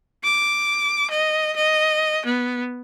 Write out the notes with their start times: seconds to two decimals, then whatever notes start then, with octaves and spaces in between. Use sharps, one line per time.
0.24 D6
1.10 D#5
1.56 D#5
2.26 B3